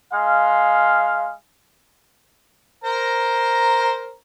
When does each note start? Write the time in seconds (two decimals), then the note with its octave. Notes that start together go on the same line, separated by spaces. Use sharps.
0.13 G#3 F5
2.84 A#4 C5 A#5